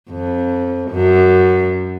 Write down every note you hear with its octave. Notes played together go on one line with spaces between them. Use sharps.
F2
F#2